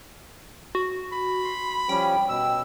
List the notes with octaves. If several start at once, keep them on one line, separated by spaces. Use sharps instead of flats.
F#4
B5
C6
F3 G3 C#4 G5
B2 E6